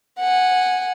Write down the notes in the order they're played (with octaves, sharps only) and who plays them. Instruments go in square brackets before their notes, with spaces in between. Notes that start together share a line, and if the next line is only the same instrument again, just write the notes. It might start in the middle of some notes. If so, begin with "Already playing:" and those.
[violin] F#5 G#5